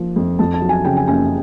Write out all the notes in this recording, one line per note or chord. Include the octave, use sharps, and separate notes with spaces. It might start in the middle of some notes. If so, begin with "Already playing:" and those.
Already playing: F3 A#3
F2
F2 A5
A5
F#3
G#5
C#3 G5
G#5
F#1 G#5